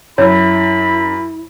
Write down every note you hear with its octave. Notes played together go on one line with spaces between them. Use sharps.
F#2 E4 C#5 B5 E6